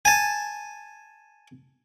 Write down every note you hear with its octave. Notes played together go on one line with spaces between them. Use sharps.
G#5 A5